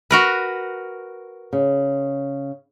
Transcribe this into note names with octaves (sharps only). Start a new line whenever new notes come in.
F#4 A#4 B4
C#3